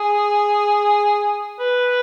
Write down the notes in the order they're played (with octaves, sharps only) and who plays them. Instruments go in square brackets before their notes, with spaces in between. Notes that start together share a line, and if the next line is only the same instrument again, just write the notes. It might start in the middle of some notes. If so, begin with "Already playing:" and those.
Already playing: [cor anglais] G#4
B4